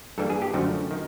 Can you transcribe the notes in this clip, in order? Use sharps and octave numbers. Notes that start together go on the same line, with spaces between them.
G2 E3 G3 A#3 A4
G#4
G4
F#2 D3 F3 A3 F#4
D#3